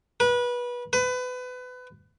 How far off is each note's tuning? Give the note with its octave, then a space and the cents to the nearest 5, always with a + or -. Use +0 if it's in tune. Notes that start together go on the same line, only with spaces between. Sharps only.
B4 -25
B4 +25